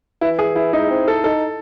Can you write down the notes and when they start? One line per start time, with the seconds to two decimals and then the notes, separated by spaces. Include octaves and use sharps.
0.21 E3 E4
0.39 G#4
0.56 E4
0.73 G#3 D#4
0.90 C4
1.08 A4
1.24 D#4 A4